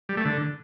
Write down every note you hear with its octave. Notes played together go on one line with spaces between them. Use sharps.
G3
A3
D3